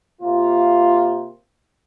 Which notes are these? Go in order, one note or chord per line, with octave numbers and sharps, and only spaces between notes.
C3 A#3 F4